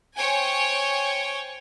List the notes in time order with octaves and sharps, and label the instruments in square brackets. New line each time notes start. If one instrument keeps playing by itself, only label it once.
[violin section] C5 C#5 G5 G#5